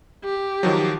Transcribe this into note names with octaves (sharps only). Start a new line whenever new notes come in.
G4
D#3 F3 F#3